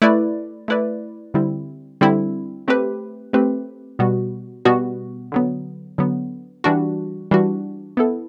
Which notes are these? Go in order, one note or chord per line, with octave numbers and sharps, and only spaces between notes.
A3 E4 B4 D5
A3 E4 B4 D5
D3 G3 C4 E4
D3 G3 C4 E4
A3 C4 G4 B4
A3 C4 G4 B4
B2 G3 B3 F#4
B2 G3 B3 F#4
D3 F#3 B3
D3 F#3 B3
E3 G3 D4 F#4
E3 G3 D4 F#4
B3 E4 A4